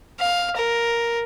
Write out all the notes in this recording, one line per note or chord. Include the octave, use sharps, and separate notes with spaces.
F5
A#4